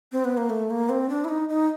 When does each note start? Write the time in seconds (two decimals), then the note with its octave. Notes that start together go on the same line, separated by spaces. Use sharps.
0.12 C4
0.25 B3
0.37 A#3
0.50 A3
0.70 A#3
0.89 C4
1.09 D4
1.25 E4
1.29 D#4
1.49 D#4